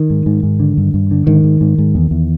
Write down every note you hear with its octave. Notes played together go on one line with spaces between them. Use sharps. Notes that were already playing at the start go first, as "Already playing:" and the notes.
Already playing: D#3
G#2
G#2
G#2
D3
G2
G2
D3
G#2 D#3
G#2
G#2
G#2
E2
E2